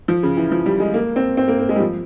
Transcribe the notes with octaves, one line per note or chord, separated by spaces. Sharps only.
F3
C#3
E3
F3
G3
G#3
A#3
C4
C4
A#3
A#3
G#3
G3
F3